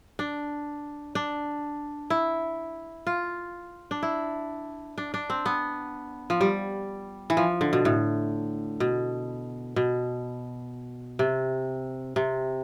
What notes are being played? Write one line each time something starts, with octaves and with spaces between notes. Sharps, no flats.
D4
D4
E4
F4
D4
E4
D4
D4
C4
B3
F3
G3
E3
F3
D3
B2
A2
B2
B2
C3
C3